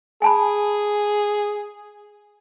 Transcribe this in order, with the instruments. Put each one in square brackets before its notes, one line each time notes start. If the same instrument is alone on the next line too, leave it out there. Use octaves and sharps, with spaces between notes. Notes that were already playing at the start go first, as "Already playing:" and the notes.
[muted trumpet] G#4 [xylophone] G#5 A5 B5